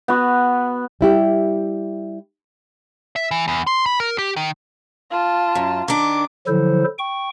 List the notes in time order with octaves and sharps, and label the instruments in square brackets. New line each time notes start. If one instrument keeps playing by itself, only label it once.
[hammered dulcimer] B3 F#4
[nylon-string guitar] G3 E4 G4
[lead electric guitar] E5
E3
E2
C6
B5
A#4
G4
D#3
[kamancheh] F4 A5
[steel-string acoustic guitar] F#2
[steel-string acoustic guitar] D#3 D4 [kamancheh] D6
[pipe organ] D3 F3 F#3 E4 A4 C5
G5 C#6